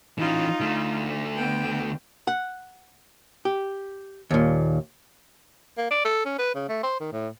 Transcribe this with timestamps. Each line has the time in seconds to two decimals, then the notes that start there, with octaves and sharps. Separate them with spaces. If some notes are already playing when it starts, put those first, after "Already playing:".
0.19 E3 C#4 D#4 F4
0.60 D3 A3
1.36 B3 G5
2.27 F#5
3.45 G4
4.31 D#2 A#2
5.78 A#3
5.90 D5
6.05 A4
6.25 C#4
6.39 B4
6.55 C#3
6.69 A3
6.83 C5
7.00 D#3
7.12 A2